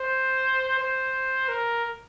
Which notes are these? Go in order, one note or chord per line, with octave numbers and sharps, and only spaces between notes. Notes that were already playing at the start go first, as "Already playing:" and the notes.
Already playing: C5
C5
A#4